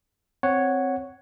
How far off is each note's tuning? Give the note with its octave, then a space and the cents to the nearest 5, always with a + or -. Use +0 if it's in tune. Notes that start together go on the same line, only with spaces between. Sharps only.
C4 +0 C#5 +0 F#5 +0